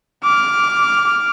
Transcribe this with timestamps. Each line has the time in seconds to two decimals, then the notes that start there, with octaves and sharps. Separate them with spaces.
0.24 D6 F6